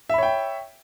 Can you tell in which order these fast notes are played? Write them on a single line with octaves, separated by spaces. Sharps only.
E5 B5 C#5 G5